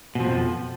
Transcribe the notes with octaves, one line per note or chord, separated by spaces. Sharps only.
F2 B2 F3